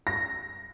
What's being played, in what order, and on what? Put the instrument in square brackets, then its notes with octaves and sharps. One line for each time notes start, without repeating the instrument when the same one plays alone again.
[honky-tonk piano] A#6